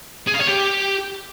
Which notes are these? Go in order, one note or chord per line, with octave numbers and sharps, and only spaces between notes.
G#4
F5
C#5
G4